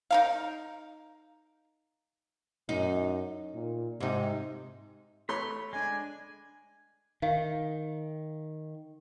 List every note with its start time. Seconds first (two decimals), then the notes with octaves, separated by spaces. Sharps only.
0.11 D#4 A#4 F5
2.69 F#2 D#4
3.55 A#2
4.00 G#2 C3 D#4
5.29 A3 C#5 B5 C6
5.73 G#3 D4 G#5
7.22 D#3 F5